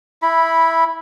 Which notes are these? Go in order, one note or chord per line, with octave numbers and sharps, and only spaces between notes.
E4 B5